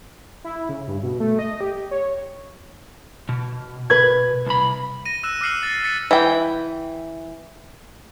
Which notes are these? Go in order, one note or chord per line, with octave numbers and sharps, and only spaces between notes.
E4
C#3
G2
B2
A3
D#5
G4
C#5
B2
B4 G#6
C2 B5
A#6 D#7
E6 F#6 E7
D6 F6 F#6 C7 C#7 F#7
A6
F6 A6 B6 C#7
E3 G5